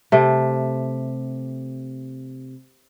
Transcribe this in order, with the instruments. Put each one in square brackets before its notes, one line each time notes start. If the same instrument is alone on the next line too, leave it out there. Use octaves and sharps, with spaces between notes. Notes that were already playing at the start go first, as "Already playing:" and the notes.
[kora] C3 A3